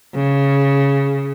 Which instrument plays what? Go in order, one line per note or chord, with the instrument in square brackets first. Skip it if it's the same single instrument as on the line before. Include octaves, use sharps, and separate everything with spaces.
[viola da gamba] C#3